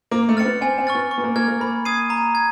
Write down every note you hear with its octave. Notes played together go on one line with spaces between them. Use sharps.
A#3 D6
A3
C4 F6 A6 C#7
B3
C4 G#5
C4
C#6 F6 A6
B3
C#6
B3
A#3
A#3 F6 G#6
A#3
A#3 B5
D#6 G#6 C7 D#7
A#5
G#6